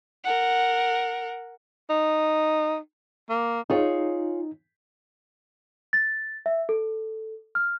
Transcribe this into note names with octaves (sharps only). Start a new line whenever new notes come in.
A#4 F#5
D#4
A#3
D#4 F4 G#4 C#5
A6
E5
A4
F6